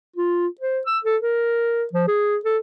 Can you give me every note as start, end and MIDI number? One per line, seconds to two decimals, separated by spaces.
0.16 0.47 65
0.61 0.80 72
0.86 0.99 88
1.04 1.17 69
1.22 1.84 70
1.93 2.06 53
2.08 2.36 68
2.45 2.58 69